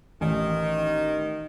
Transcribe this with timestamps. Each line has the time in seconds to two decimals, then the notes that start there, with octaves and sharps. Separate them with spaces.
0.21 A1 D#3